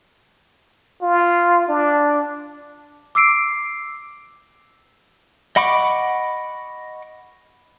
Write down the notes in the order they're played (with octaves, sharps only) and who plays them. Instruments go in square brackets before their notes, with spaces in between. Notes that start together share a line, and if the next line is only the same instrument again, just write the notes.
[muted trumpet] F4
D4
[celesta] D6 E6 C7 D7
[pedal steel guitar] D#5 F#5 B5 C#6 D6